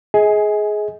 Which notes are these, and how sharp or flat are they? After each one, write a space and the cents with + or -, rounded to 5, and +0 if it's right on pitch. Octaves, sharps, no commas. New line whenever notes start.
G#4 +15 D#5 +40 G#5 +0